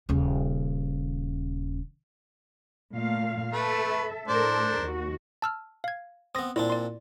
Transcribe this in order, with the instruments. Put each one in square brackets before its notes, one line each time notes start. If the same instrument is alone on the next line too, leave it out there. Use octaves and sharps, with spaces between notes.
[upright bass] D#1 C#3
[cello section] A#2 A3 F5
[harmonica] A3 B4 [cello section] A4 E5
[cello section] A2 A4 A#4 [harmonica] D4 C5
[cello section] D#2 F#4
[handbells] A5 E6 F6
F5 G#6
[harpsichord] B3 C4 [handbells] D#6 A#6
[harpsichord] A#2 C4 D4 [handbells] E4
[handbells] D5 C6